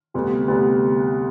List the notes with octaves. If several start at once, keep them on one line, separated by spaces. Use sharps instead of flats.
D2 C3 G3 B3
D2 C3 G3 B3